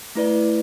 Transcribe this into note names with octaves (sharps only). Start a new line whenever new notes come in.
A3 E4 B4 D5